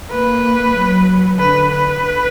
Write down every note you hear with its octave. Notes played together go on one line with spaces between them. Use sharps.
A#3 B4
F#3
D3 B4
B4